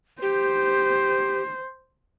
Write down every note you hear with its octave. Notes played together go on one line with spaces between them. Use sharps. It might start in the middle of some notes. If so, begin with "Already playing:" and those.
G4 C5